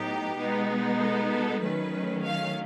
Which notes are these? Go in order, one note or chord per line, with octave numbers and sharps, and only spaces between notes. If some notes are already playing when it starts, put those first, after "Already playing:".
Already playing: A2 F#3 B3 D#4 G4
B2 G#3 B3 D#4
A4
A4
D#3 F#3 A3 C#4 B4
F5